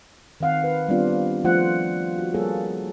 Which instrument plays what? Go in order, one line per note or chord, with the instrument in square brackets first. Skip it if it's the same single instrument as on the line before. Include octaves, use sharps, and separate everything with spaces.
[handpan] D#3 C4 F5 F#5
B4
G3 B3 C4 D4 F4
F3 A3 F4 C5 F#5
F#4
G3 A#3 G#4 A4 C#5